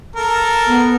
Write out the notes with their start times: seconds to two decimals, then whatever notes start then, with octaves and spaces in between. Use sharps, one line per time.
0.16 A4 A#4
0.67 B3